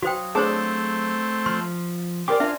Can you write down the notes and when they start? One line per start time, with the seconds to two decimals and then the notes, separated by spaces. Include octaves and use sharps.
0.03 F#3 F#4 C5 F5 G5 D#6
0.35 A3 C4 D4 G#4 C5 C#5 A5
1.46 F3 C6 F6
2.28 G4 G#4 A#4 C5 D5 D6
2.40 D4 F4 C5 E5 G#5